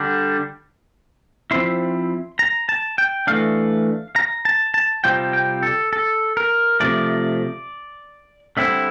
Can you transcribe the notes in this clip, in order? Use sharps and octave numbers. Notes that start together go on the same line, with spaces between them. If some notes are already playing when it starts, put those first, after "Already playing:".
Already playing: D3 G3 D4
F3 C4 E4 C6
A#5
A5
G5
E3 A3 D4 F5
A#5
A5
A5
C3 G3 C4 F4 G5
G5
A4
A4
A#4
C3 F3 A3 D5
D3 G3 C4 E4 E5